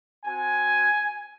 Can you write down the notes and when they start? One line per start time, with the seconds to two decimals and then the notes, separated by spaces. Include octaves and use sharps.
0.25 C4 F#4 G#5